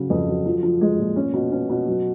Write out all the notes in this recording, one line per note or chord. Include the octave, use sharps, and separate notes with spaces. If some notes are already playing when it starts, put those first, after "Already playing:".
Already playing: C#3 F#3
F2
F#3
F3
F3
G#3
A#2
C#4
B2
C#4
B2
F#3